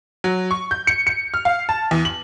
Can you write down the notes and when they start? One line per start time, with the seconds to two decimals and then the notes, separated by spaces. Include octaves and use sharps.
0.24 F#3
0.51 C#6
0.71 G6
0.87 C#7
1.07 C#7
1.34 F6
1.45 F5
1.69 A5
1.91 E2
2.05 F#7